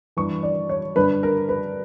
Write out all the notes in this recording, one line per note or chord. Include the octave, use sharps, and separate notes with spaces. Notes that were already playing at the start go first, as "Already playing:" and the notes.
G2 E3 C#6
D5
C#5
G2 D3 B4
A#4
B4